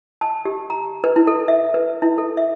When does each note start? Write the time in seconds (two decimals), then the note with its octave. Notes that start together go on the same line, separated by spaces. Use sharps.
0.21 A5
0.45 G4
0.70 A#5
1.04 B4
1.16 E4
1.27 A4
1.48 E5
1.74 B4
2.02 E4
2.18 A4
2.37 E5